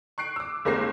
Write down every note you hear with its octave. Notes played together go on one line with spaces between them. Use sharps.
C#6 F#6 C7 D7
D6 E6
F1 G#3 A#3 G4 A#6 C7